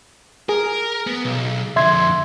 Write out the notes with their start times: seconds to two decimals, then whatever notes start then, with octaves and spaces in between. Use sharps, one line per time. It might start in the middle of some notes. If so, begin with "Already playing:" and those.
0.49 G#4 A#4
1.07 B3
1.25 B1
1.76 F2 D3 E5 C6 G#6